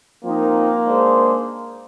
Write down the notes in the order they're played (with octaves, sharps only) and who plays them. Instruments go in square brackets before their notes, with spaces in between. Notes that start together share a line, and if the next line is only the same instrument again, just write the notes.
[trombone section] F3 C4 D#4 A#4 [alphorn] A#3
[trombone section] G#3 D4 G#4 C5